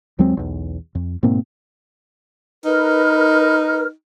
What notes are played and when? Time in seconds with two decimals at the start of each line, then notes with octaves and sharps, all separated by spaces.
0.19 D#2 F#3 G#3 C4
0.37 B1 E2
0.95 F2
1.23 G#2 B2 A#3 C4
2.65 D#4 A#4 B4 F6